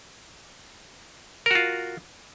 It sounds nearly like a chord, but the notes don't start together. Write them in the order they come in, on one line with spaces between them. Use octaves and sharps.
A#4 F#4 F4